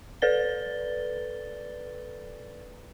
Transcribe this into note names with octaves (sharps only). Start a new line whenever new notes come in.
A4 B4 D5 A6 G7